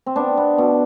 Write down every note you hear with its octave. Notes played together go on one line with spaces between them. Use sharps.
C4
B3 D4
B3
B2